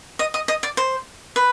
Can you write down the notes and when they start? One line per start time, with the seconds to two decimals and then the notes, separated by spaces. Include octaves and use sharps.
0.19 D#5
0.34 D#5
0.48 D#5
0.63 D5
0.77 C5
1.36 B4